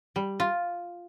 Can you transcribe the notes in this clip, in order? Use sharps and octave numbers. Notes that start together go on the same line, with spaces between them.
G3
F4